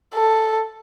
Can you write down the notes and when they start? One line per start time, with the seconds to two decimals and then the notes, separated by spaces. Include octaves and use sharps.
0.14 A4